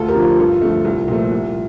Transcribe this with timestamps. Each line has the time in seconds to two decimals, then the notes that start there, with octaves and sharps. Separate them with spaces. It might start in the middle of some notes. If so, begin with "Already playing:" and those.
Already playing: D2 F4 A4
0.08 G4 A#4
0.15 D3 F3
0.23 F4
0.39 G2 F4 A4
0.54 F4
0.61 D3 F3 A3
0.70 F4
0.85 C2
1.08 A#2 F3 A3
1.31 C2